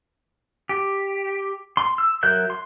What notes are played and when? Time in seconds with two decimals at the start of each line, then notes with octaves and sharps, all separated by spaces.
0.69 G4
1.77 C6
1.98 E6
2.23 F#3 A#4 E5 F#6 G6
2.50 C6